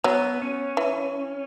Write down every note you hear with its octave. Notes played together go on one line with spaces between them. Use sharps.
F#3 B3
C#4
E3